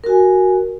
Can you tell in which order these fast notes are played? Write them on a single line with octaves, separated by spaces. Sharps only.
A#4 F#4 G#5